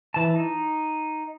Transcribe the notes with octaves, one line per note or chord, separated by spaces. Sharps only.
E3 A5
D#4